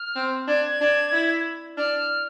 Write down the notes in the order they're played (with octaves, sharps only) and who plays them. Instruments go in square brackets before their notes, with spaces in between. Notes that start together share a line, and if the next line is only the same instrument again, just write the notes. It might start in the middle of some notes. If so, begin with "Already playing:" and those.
Already playing: [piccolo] F6
[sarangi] C4
[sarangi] D4 [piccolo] G#6
[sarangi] D4
E4
[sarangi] D4 [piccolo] F6